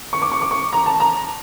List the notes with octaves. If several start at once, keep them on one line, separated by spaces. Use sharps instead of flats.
C#6
D6
C#6
D6
C#6
A#5
A5
A#5